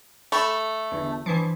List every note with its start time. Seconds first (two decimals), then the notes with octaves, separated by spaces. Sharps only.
0.32 A3 A5 B5 C#6
0.92 G1 E2
1.26 G2 E3 F3